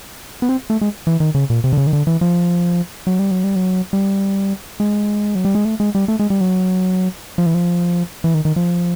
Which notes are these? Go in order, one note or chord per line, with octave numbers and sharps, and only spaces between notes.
B3
C4
A3
G#3
E3
D#3
C#3
A#2
C3
D3
C#3
D#3
D3
E3
F3
F#3
G3
F#3
G3
F#3
G3
G#3
F#3
G3
G#3
A3
G#3
G3
A3
G#3
G3
F#3
F3
E3
F3
E3
D#3
D#3
F3